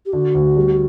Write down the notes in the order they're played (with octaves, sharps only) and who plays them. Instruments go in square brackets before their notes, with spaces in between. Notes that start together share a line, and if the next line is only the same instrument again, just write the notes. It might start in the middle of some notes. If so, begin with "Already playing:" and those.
[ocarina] G4
[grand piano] D3 [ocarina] F#4
[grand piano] D2
G3